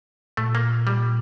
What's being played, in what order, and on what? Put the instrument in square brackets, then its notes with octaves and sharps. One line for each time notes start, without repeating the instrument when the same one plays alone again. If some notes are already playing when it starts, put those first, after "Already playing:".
[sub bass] A#2 [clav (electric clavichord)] A3
[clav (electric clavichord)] A#3
G3